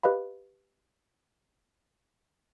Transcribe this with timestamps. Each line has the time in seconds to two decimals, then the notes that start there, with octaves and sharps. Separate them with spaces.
0.03 G4 B4 D#5 F5 B5